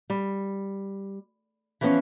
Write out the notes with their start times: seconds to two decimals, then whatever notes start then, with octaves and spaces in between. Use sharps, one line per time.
0.10 G3
1.81 E3 F3 G3 B3 C#4